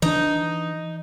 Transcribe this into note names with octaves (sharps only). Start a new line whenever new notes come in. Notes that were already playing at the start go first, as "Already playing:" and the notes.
E3 D4 D#4